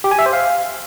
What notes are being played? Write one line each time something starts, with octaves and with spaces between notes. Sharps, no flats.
G4
G#5
E5
C5
F5